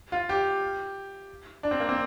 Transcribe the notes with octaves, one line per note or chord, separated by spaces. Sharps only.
F4
G4
D4
C4
A#3
C4